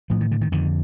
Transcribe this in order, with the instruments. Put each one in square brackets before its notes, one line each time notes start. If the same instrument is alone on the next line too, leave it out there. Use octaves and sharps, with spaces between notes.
[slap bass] A2 F3
D#3
D3
D#3
F2 D3 D#3